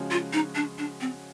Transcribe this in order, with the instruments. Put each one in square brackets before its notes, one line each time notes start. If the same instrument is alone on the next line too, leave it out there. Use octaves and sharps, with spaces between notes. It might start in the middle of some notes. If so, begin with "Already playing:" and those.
Already playing: [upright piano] C#3 F3 G#3 C#4 F#4
[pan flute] F4
D#4
D4
D4
C4